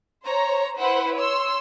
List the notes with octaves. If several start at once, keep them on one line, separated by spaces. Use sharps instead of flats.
C5 C#5 A#5
E4 B4 C5 F#5 B5
C#5 C6 E6